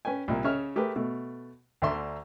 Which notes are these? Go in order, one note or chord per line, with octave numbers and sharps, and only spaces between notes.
C#4 B4 G5 G#5
C2 A#2 A#3
C#3 C#5 D#5 E5 F6
A3 G4 G#4 A#4 B4
B2 A3
D2 D3 D5 E5 A#5 C6